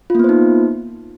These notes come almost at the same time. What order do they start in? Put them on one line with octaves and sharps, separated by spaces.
F4 A#3 B3 C5 D#4